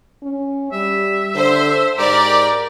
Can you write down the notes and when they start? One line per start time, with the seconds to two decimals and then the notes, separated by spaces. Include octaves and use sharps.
0.23 C#4
0.72 G3 E5
1.35 D3 C5
1.98 G#2 G4 A#4 D5